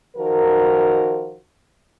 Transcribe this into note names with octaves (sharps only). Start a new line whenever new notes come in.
D#3 F3 F#4 A#4